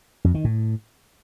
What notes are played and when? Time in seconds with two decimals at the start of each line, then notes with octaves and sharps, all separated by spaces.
0.24 F2
0.34 D#3
0.44 A2